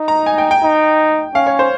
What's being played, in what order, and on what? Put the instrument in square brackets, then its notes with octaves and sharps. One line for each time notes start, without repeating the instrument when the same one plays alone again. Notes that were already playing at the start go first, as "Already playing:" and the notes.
Already playing: [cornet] D#4
[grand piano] A#5
G#5
G5
G5
[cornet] D#4
[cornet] C#4 [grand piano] F5
[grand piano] C#5
C5